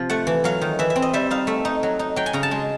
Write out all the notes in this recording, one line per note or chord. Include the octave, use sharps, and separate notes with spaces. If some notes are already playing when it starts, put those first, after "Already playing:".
Already playing: C3 F3
A3 F#5
E3
F#3 F5
D#3
E3 E5
E5
C4
D#5
G3 E5
D#4 F5
A3 E5
D#4
F#3
D#4
F#3 G5
G#5
C#3 A#5
A5
G#3